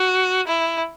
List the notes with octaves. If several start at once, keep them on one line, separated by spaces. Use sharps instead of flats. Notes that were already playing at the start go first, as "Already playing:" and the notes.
Already playing: F#4
E4